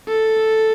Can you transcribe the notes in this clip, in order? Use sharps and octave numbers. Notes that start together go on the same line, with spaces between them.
A4